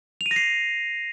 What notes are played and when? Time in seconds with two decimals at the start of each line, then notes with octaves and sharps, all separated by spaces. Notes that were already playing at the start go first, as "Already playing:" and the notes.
0.21 F7
0.26 D#7
0.31 A#6
0.36 C7